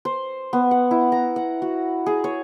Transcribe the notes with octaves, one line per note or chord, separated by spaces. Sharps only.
C5
B3
F#5
E4
A#5
F#5
F#4
G#4
C#5